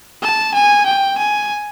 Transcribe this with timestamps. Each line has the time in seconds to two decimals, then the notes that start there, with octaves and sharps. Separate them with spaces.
0.23 A5
0.55 G#5
0.86 G5
1.18 G#5